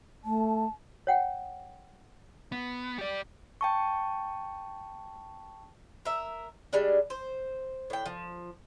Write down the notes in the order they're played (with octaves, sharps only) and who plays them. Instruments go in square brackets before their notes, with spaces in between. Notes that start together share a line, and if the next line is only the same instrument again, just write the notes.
[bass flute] A3 [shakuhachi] A5
[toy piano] C#5 F#5 G5
[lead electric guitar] B3
G4 D5
[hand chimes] G5 A5 C#6
[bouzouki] A#4 E5
G3 G#3 D4
C5
A2 G5
F3